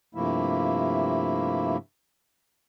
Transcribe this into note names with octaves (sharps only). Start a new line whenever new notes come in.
G2 C3 F3 A3 A#3 E4